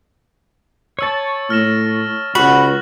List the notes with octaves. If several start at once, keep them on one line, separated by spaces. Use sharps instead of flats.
C#5 A5 C#6 E6 A6
A2 F6 A#6 E7
C#2 F#4 B5 F#6 F#7